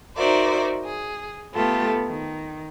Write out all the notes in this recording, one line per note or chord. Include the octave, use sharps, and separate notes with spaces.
D#4 F#4 A#4 C5 D5 E5
G#4
A3 B3 F4 G4 A4
D#3